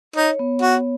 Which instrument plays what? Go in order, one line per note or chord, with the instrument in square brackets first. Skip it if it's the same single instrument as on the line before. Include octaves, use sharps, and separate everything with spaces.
[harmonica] D#4 [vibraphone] C#5
[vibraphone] B3
[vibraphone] B3 [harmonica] F#4